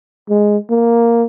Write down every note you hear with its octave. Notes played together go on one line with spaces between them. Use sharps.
G#3
A#3